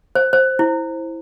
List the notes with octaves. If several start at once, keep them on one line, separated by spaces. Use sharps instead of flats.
C5
C5
E4